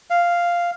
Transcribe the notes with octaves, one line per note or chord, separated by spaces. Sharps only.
F5